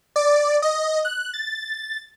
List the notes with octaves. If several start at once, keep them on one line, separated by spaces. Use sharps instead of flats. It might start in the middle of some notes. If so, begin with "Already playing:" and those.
D5
D#5
F#6
A6